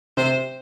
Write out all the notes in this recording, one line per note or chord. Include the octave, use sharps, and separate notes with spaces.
C3 C5